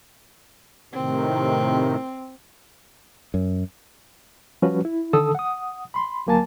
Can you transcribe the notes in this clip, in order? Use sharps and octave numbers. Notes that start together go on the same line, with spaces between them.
A2 C3 D#3 C4
F#2
F3 G3 C#4 F#4 B4
E4
D3 D#3 A4 A5 D#6 E6
F#5 D#6
B5 C6
D2 F#3 A#3 G#5 A5 A6